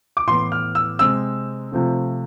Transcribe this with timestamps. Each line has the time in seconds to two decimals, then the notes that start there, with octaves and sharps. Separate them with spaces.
0.17 D6
0.27 A2 E3 B3 C6
0.52 F6
0.75 E6
0.99 C3 G#3 C4 E6
1.72 C3 F3 A3 C4